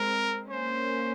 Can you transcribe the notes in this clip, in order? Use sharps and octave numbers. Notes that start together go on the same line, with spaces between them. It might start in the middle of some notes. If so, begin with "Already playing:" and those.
Already playing: G#3 C4 A#4
A#3 C#4 C5